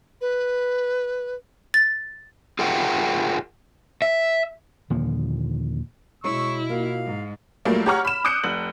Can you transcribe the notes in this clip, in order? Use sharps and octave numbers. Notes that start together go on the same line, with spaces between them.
B4
A6
F4 G#4 A#4 E5 F#5 G5
E5
D#2 A#2 D3 F3
B2 G#3 E4 C#5 C#6 E6
A#3 F4 F#4 F5
G#2
A#2 F#3 G3 A3 A#3
G4 C#5 F#5 A#5 C#6 F6
B5 E7
D6 D#6 F#6 G6 C#7 D7
F1 F#7